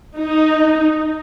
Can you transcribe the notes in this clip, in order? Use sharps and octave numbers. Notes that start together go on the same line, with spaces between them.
D#4